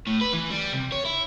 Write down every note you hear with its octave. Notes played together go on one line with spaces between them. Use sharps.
A2
B4
E3
G3
C3
C#5
E4